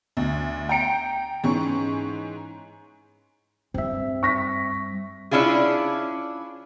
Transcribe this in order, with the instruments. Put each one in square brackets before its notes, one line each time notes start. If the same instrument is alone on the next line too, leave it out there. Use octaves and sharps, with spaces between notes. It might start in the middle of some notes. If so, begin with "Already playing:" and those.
[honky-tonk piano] D2
G5 A#5 C#7 D7
G#2 E3 C#4 C#6
[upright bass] G2 G3 [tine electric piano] C4 E5
[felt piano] C#6 A#6 B6
[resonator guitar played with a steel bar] C#4 D4 E4 F4 G#4